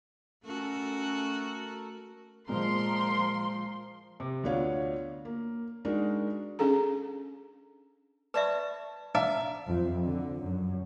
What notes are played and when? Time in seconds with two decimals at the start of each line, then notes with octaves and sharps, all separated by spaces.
0.45 A3 C#4 F#4 A4 A#4
2.49 A#2 F3 G#3 A#4 C6
4.20 C3
4.44 D2 B3 D4 F4 C#5 F5
5.25 A#3
5.85 G#3 D4 D#4 F#4 A#4
6.59 C#4 D4 G#4 A4 A#5
8.34 B4 D5 E5 A5 B5 C#6
9.15 D4 E5 F5 A#5
9.69 F2
10.04 D3
10.43 F#2